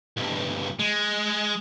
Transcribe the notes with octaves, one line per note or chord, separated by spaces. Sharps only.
B1 G2
G#3